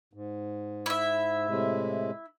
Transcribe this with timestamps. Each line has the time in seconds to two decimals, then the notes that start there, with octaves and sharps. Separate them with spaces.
0.13 G#2
0.86 E4 E5
1.48 A2 C3 G#3